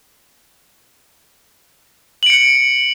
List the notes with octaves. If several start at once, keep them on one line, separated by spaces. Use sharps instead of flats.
C#7 D7 F#7